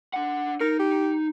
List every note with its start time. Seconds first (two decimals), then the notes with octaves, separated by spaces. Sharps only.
0.14 D4 F#5
0.61 D#4 A#4
0.79 G4